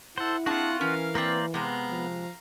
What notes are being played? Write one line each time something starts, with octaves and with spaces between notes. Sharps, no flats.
E4 A4 C5 F#5
C4 D4 F4 F#4 G#4 F#5 A5
E3 C#4 A#4 F5
A#3 C4 B4 C5 D5
C3 G#3 B3 F5 A#5
F3